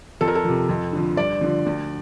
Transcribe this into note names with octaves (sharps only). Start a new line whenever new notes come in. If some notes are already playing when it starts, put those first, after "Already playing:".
F2 A4
A#4
A4
C3 F3
F2
D3 F3
G2 D5
D3 F3
D2